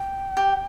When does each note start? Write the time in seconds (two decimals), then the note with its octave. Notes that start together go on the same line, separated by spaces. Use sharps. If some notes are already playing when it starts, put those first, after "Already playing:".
Already playing: G5
0.37 G4